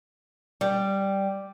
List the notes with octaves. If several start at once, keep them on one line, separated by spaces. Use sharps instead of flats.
G3